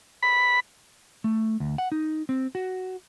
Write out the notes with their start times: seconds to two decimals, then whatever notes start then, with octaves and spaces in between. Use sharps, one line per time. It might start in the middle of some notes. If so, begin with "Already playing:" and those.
0.23 B5
1.24 A3
1.60 D2
1.78 F#5
1.92 D#4
2.29 C4
2.55 F#4